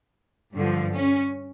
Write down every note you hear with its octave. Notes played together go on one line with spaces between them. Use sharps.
G2 D3 F3
C#4